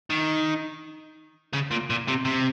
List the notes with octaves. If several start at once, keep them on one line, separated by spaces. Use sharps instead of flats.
D#3
C#3
A#2
A#2
C3
C3